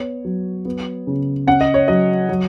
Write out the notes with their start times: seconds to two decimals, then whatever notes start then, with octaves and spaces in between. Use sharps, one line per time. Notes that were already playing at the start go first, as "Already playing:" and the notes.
Already playing: B3 C#5
0.25 F#3
0.65 B3
1.07 C#3
1.47 C#4 F#5
1.61 D#5
1.74 C#5
1.88 F#3 D#5
2.29 F#3